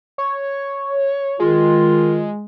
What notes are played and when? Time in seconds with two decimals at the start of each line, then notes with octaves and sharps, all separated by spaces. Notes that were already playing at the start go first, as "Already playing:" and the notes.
0.18 C#5
1.40 D#3 G#3 F4